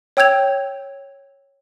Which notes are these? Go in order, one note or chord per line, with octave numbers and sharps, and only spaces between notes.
C#5 G5 E6 G6 G#6 F7